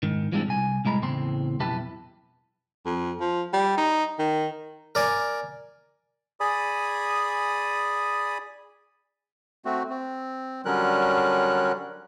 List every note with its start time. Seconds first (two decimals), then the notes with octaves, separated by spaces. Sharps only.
0.03 G#2 D#3
0.32 E3 F3 G3 G#3 C4 D4
0.47 C2 G#5
0.85 C2 A2 G#3 A#5 B5
1.02 E2 A2 C#3 C4 C6
1.60 B1 F2 E4 G4 B4 A5
2.86 F2
3.21 F3
3.53 G3
3.78 D#4
4.19 D#3
4.95 A#4 D5 G#5
6.40 G#4 D5 G#5 B5 D#6
9.65 A3 C4 F#4
9.90 C4
10.65 D3 F#3 G3 C#4 A#4 F#6